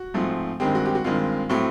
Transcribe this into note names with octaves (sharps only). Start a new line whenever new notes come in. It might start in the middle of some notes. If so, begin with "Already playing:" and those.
Already playing: F#4
G#2 F3 A3 C4
G2 D#3 G#3 C4 G4
F#4
G4
F#4
G2 D#3 G#3 C4 F4
A2 F#3 A3 C4